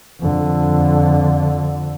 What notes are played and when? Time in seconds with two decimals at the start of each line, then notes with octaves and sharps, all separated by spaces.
0.19 F2 D3